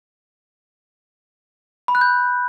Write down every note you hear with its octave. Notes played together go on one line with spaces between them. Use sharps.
B5
F#6
G6